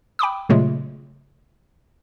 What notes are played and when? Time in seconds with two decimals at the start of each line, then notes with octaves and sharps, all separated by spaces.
0.19 G5 B5 D6 D#6
0.49 A#2 C#3 F#3 G#3 A3 F4